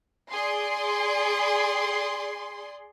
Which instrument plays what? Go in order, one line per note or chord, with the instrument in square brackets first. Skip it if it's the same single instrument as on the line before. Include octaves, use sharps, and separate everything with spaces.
[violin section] G#4 D5 C6